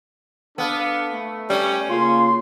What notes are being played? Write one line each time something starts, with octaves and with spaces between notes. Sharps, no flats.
B3 D4 A4 F5
A3
G3 C#4
C#3 A#3 F4 C6